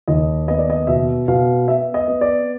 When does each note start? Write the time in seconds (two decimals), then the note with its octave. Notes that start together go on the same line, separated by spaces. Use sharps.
0.08 D#2 D#5
0.48 B3 D#5
0.58 D5
0.70 D#5
0.87 B2 E5
1.28 B2 F5
1.68 B3 E5
1.94 D#5
2.08 B3
2.21 D5